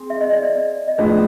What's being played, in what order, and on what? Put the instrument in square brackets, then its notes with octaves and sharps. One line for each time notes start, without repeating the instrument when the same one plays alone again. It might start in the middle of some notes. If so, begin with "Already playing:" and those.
Already playing: [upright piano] C4 G#4
[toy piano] E5
D#5
D5
D5
D#5
[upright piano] A2 F3 G#3 B3 D4 [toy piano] D5